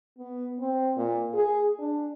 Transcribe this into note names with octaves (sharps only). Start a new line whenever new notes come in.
B3
C4
A#2
G#4
D4